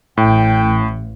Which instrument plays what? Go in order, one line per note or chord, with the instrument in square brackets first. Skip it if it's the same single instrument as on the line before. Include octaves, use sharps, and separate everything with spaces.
[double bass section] A1 [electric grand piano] A2 [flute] G5